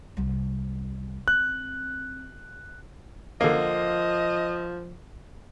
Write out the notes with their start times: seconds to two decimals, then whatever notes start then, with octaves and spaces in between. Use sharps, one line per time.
0.17 C2 G3
1.28 C4 F#6
3.41 D3 F3 A#3 D#5